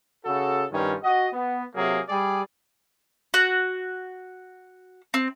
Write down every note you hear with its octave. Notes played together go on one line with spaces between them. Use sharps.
C#3 F#4 A4
G2 D#3 F3 C#4
F#4 D#5
B3
C3 F#3 A#3 G#4
G3 G4 G#4 D5
F#4
C4